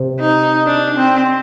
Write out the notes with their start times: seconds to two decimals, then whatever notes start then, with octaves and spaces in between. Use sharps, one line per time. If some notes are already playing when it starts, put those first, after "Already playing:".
Already playing: C3
0.20 D#4
0.66 D4
0.97 C4